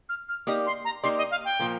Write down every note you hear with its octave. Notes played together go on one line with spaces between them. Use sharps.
F6
F6
A#3 D#4 G4 D5 D#6
C6
A#5
A#3 D#4 G4 D5 C6
D#5
F5
G5
A#2 F3 A#3